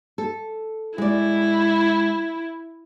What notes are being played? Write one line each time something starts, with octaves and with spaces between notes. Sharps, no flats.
A4
G#3 E4 D5